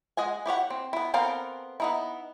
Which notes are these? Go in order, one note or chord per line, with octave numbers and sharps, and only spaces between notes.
G#3 D#5 F#5 G#5
E4 G4 C#5 F#5
C4
B3 E4
B3 C4 A4 A#4 F5
B3 D#4 E4